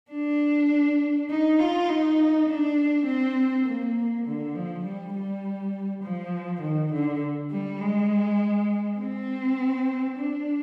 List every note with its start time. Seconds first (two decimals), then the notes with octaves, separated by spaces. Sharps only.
0.11 D4
1.30 D#4
1.59 F4
1.89 D#4
2.49 D4
3.07 C4
3.66 A#3
4.26 D3
4.55 F3
4.85 G3
5.14 G3
6.04 F3
6.62 D#3
6.93 D3
7.51 G3
7.81 G#3
9.00 C4
10.18 D4